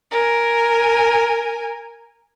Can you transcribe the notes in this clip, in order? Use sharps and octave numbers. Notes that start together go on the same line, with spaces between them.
A#4 G#5